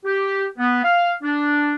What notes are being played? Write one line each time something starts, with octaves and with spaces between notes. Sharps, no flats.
G4
B3
F5
D4